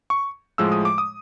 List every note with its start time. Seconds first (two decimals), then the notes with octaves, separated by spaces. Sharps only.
0.10 C#6
0.58 A2 F3 G#3 E6
0.72 D#6
0.85 D6
0.98 D#6